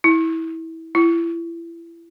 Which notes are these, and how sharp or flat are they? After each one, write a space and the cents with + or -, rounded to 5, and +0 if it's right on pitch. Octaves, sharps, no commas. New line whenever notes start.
E4 -20
E4 +30